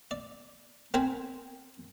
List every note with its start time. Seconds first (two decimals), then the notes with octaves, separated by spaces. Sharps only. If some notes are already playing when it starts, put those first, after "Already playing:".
0.11 D5
0.94 C4 A#4 G5 G#5 B5